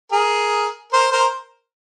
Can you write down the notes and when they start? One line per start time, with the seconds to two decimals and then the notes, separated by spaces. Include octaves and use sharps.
0.12 G#4 A#4
0.93 A#4 C5
1.12 A#4 C5